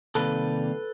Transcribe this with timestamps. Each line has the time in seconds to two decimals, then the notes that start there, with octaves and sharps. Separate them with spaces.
0.15 C3 D#3 G3 A#3 A4 B4